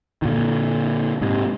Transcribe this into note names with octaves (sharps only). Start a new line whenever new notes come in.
D#3
A#2 D3
G#2 C3